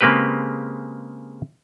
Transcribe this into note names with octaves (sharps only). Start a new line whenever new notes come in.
C#3 G#3 A#3 C4 G4 B4